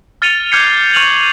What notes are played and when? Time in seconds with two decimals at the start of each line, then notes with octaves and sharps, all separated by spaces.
0.22 F6 A6 C#7 D#7 F7 G7
0.52 D6 F6 G6 G#6 C7 C#7
0.94 C#6 F6 D#7 F7 F#7